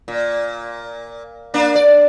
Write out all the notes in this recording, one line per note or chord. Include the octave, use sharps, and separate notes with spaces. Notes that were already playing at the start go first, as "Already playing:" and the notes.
A#2
A#3 D4
D5